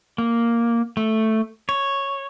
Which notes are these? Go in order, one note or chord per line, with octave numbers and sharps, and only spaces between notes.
A#3
A3
C#5